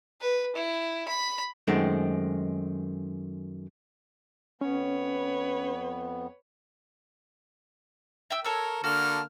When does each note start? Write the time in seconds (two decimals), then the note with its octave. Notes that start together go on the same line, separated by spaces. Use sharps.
0.21 B4
0.56 E4
1.08 B5
1.67 F#2 D#3 G#3 A3 C4
4.61 F2 B3 C#4 B4 C#5
8.30 E5 G5 E6
8.44 A4 A#4 C#5 E6
8.84 D3 A#3 F#4 A4 F6